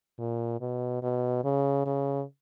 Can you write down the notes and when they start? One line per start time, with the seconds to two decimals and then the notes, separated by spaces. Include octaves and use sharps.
0.19 A#2
0.61 B2
1.02 B2
1.44 C#3
1.86 C#3